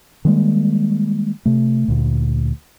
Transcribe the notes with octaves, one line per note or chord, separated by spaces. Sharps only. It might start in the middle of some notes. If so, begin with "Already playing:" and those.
D#3 G3 G#3 A#3
C3 A3
D2 A#2